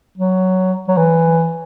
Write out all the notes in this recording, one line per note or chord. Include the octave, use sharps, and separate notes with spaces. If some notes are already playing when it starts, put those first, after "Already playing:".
F#3
F#3
E3